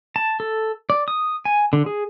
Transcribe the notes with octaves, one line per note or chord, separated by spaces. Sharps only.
A5
A4
D5
D#6
G#5
D3
G#4